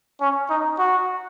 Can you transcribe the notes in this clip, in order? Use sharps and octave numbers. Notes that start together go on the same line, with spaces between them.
C#4
D#4
F#4